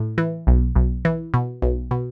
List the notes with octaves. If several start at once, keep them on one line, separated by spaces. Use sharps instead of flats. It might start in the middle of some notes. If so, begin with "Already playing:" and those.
Already playing: A2
E3
B1
B1
E3
B2
B1
B2